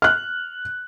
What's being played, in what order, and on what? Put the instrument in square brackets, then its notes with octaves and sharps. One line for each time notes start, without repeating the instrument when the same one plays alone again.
[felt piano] F6 F#6